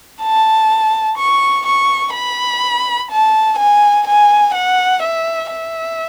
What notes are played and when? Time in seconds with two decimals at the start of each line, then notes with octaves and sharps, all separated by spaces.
0.22 A5
1.18 C#6
1.66 C#6
2.14 B5
3.11 A5
3.59 G#5
4.07 G#5
4.55 F#5
5.03 E5
5.51 E5